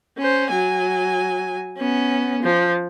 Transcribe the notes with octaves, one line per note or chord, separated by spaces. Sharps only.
C#4 C5
F#3 G#5
B3 C#4
F3